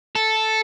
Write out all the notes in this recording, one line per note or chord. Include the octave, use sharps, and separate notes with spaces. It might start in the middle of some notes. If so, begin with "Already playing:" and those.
A4